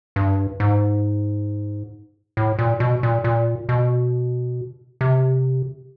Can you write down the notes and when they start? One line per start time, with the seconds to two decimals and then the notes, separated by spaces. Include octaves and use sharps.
0.16 G2
0.60 G#2
2.37 A2
2.59 A#2
2.80 B2
3.03 A#2
3.24 A#2
3.69 B2
5.01 C3